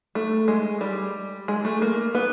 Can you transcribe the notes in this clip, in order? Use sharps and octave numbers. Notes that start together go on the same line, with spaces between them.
A3
G#3
G3
G#3
A3
A#3
B3